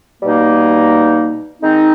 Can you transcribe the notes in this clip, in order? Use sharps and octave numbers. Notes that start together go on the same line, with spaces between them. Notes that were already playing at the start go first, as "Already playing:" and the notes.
B2 G3 A#3 D#4
D#3 G#3 C4 D#4